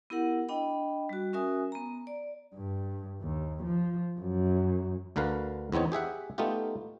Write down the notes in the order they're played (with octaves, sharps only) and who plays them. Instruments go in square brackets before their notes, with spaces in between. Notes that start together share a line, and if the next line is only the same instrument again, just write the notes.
[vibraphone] B3 E4 G4 A#4 F#5
D4 D#5 G5 B5
G3 F#4
C#4 F#4 A#4 E5 G#5 D#6
B3 A#5
D5
[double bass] G2
D#2
F3
F#2
[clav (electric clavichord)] D2 D3 A#4 B4 F5
E2 B3 C4 D#4 C#5
G4 G#4 E5 F#5
A3 B3 D#4 F4 G4